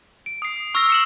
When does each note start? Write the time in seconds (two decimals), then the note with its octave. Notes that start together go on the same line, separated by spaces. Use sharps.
0.26 D7
0.42 D#6 C7
0.75 C#6 E6 F6 A#6 F7
0.90 C#7 E7 F#7